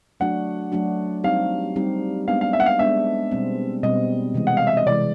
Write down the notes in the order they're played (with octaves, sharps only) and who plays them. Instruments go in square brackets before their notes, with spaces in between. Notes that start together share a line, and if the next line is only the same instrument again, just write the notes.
[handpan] F#3 A3 D4 F#4 [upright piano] F#5
[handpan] F#3 A3 D4 F#4
[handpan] G3 C4 D#4 G4 [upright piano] F5
[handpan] G3 C4 D#4 G4
[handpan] G#3 B3 D4 [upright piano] F5
[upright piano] F5
E5
F#5
F5
[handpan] G#3 B3 D4 [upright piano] E5
[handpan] B2 G3 C4
[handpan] B2 G3 C4 [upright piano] D#5
[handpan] C3 E3 G#3
[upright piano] F#5
F5
E5
D#5
[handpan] C3 E3 G#3 [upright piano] D5